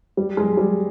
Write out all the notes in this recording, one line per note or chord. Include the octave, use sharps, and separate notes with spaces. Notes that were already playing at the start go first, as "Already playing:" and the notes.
G3
G#3
G3